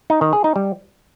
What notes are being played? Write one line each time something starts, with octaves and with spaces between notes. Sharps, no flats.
D#4
D#3
G#4
D#4
G3